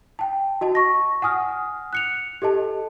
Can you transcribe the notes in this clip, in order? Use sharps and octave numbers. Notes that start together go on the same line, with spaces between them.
G5 A5
F#4 D#5 A5
C#6 A#6
F#5 G#5 D#6 F6
F#6 C#7 F7
G4 A4 D#5 A5